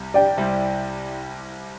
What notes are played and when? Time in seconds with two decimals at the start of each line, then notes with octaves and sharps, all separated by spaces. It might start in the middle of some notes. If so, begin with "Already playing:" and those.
Already playing: C2 C3 G3
0.14 D5 G5
0.37 C2 C3 G3 C4 E4